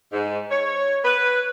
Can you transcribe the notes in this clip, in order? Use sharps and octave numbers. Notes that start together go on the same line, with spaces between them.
G#2
C#5
B4